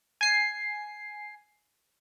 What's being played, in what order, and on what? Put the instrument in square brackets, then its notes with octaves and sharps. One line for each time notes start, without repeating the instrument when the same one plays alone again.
[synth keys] G#5 C7